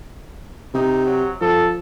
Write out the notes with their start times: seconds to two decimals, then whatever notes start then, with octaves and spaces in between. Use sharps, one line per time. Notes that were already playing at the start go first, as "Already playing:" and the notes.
0.74 C3 D#4
1.06 F#3
1.41 F3 A4